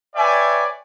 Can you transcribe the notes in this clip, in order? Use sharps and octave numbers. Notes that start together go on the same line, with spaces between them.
B4 C#5 D5 E5 G5 G#5